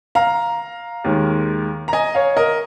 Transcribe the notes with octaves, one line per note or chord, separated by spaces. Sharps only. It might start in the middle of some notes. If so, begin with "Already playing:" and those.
F5 A#5
D#2 D#3 G#3
A#5
D#5 G#5
C#5 F5
A#4 D#5